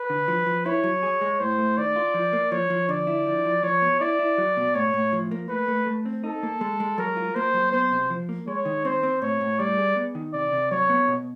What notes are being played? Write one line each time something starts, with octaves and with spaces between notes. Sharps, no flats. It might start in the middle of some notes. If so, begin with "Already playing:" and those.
Already playing: B4
D3
F3
F3
E4 C#5
F#3
G#4
G#3
A2 C5
A3
D#3 D5
F4
F3
A#3
F3 C#5
F3
D3 D5
E4
F3
F3
F3 C#5
B3
E4 D5
E4
F#3
B2
A2 C#5
A2
F3
A#3
A3 B4
A3
A3
C4
D#4 A4
A#3
G#3
G#3
F#3 A#4
F4
A#3 C5
F#3
B3 C5
C3
F3
A#3
G#3 C#5
D#3
C4 C5
C4
A2 C#5
A2
G3 D5
G#4
B3
D#3
C3 D5
C3
F#3 C#5
B3
B2